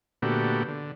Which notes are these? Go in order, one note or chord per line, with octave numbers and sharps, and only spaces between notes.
A#2 D3 A3 B3 F#4 G4
D3